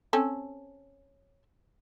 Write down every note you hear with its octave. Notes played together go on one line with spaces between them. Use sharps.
C4 C#4 A4